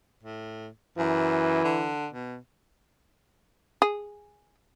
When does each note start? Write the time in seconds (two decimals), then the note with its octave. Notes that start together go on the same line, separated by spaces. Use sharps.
0.23 A2
0.98 F#2 E3
1.64 D3
2.13 B2
3.82 G#4